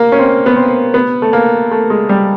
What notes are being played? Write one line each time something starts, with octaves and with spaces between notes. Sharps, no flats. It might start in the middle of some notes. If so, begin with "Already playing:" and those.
Already playing: A#3
C#4
C4
B3
C4
B3
A3
A#3
A3
G#3
G3